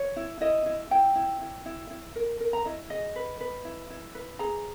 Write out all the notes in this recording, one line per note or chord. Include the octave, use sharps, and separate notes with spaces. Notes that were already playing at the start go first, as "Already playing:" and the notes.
Already playing: C#5
E4
E4 D#5
E4
E4 G5
E4
E4
E4
E4
A#4
A#4
A#5
E4 D#5
G#4 D#5
B4
B4
E4
E4
B4
G#4 A#5